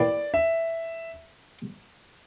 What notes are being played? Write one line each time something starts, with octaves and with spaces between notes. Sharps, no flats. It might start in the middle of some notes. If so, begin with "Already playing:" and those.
Already playing: A#3 E4 G4 B4 D5
E5